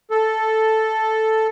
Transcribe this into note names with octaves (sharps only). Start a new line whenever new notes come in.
A4